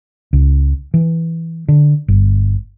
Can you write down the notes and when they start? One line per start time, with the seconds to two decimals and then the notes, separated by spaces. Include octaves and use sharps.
0.33 C#2
0.94 E3
1.68 D3
2.08 G1